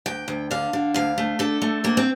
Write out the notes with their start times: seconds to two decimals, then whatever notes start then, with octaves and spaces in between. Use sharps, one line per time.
0.06 D2 G5
0.28 D2
0.51 D3 F5
0.73 D3
0.94 D2 F5
1.18 A3
1.39 D3 A4
1.62 A3
1.84 D2 A#3
1.97 C4